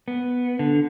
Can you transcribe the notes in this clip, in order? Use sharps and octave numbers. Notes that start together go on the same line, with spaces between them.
B3
D3